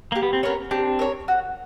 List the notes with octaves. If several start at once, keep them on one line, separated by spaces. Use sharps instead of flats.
A#3 G4
B3
C4
B3 C#4 A#4 C#5
C4 D4 G4
A#4 C#5
F#4